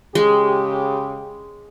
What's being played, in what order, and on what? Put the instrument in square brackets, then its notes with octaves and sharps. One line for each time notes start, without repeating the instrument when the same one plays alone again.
[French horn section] C#3 G4 [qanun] G#3